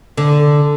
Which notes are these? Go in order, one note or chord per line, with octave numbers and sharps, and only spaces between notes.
D3